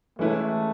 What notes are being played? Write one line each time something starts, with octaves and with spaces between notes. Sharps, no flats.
E3 G#3 A3 C#4 E4 B4